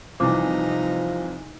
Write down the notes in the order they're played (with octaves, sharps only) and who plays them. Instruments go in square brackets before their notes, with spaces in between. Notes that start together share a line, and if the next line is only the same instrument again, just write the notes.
[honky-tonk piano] C2 C3 E3 [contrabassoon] F3 [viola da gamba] D#4 [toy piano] E4 D6